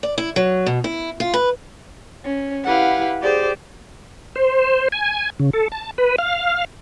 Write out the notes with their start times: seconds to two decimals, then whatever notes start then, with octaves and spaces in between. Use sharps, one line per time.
0.03 D5
0.18 E4
0.36 F#3
0.66 B2
0.84 E4
1.20 F4
1.34 B4
2.26 C#4
2.66 E4 G4 B4 F5 F#5
3.22 G4 G#4 C5 D5
4.36 C5
4.92 G#5
5.40 C#3
5.53 A4
5.72 A5
5.98 B4
6.18 F5